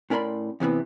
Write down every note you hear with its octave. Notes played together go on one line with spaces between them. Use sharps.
A2 C#4 A#4 D5 B5 C6
E2 C3 E3 B3